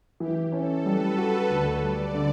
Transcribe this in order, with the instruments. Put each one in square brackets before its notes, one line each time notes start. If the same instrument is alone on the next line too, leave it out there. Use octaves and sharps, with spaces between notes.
[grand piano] E3 [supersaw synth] G4
[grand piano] C#4 [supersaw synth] A4
[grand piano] G3 [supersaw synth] B4
[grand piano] F#4
[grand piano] D2 [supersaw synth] C#5
[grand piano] G3 [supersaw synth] D5
[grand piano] D3